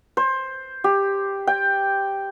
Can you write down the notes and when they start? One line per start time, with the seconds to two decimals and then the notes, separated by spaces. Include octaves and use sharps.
0.17 C5
0.84 G4
1.47 G5